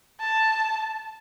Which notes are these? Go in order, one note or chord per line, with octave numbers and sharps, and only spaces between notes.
A5